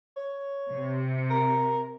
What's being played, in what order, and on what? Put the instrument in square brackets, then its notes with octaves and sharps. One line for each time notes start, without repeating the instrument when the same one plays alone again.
[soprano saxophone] C#5
[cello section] C3
[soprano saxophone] A#4